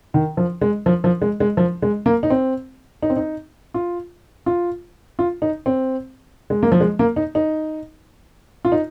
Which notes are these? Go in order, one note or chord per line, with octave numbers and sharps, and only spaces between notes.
D#3
F3
G#3
F3
F3
G#3
G#3
F3
G#3
A#3
D#4
C4
D#4
C4
D#4
F4
F4
F4
D#4
C4
G#3
A#3
F3
G#3
A#3
D#4
D#4
F4
D#4